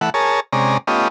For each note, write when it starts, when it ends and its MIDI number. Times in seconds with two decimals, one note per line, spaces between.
0.01 0.10 52
0.01 0.10 57
0.01 0.10 78
0.14 0.40 68
0.14 0.40 70
0.14 0.40 73
0.14 0.40 81
0.53 0.78 48
0.53 0.78 56
0.53 0.78 61
0.53 0.78 74
0.53 0.78 82
0.87 1.08 57
0.87 1.08 59
0.87 1.08 61
0.87 1.08 65
0.87 1.08 67
0.87 1.08 75